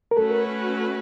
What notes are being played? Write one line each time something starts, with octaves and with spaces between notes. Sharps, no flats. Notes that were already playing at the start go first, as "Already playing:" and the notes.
A#4
A3 C#4 F#4 A4 B4
A#4